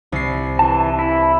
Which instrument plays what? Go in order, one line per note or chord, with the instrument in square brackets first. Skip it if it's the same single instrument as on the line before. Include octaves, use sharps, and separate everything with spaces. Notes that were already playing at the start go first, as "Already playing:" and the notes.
[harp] C2 C7
[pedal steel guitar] E3 A5
E4